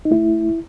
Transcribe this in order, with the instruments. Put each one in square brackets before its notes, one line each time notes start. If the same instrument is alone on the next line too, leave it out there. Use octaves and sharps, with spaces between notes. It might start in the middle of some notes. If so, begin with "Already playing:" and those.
[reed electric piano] D#4
A3 E4